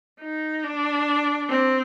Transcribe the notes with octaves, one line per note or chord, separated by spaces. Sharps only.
D#4
D4
C4